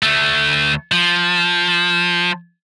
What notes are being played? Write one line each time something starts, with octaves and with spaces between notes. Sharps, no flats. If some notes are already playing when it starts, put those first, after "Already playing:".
D2 A3
F3